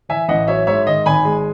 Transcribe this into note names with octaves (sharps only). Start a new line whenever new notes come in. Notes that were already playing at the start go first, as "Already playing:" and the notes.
E3 E5 G#5
A1 D#5 F#5
F#3 C#5 E5
G#2 C#5 E5
D#3 D#5
G#1 G#5 B5
G#3